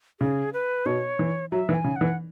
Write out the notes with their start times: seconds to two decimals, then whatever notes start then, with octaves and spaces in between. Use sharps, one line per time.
0.20 C#3 G#4
0.53 B4
0.86 B2 C#5
1.19 E3
1.52 F#3 E5
1.69 E3
1.74 G#5
1.84 C#3
1.96 E3 F#5